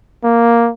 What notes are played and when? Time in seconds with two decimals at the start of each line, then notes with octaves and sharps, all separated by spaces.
0.24 A#3